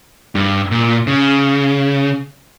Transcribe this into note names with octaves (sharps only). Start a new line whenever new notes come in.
G2
A#2
C#3